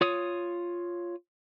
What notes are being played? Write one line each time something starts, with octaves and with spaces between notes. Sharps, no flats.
F4 C#5 D#6